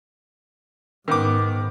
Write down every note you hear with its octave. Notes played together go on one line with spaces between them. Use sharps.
G#2 D#3 B3 D6